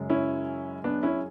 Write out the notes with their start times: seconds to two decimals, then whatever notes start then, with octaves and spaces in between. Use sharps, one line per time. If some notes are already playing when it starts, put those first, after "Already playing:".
Already playing: F#2 C#3 G#3
0.10 C#4 E4
0.84 B3 D4
1.03 C#4 E4